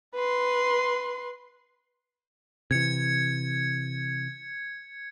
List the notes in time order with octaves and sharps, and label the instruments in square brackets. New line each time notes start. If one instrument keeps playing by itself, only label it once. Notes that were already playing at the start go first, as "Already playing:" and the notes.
[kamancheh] B4 C6
[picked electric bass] C3 E3 [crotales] G#6 C#7